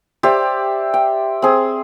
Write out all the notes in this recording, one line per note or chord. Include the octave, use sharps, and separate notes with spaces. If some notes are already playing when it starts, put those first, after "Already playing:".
G4 C5 D5 E5
G5
C4 G#4